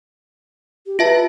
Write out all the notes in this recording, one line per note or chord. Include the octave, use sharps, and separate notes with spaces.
G4
F4 B4 E5 A5